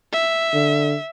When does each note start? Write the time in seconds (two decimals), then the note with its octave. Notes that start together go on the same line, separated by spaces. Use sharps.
0.12 E5
0.53 D3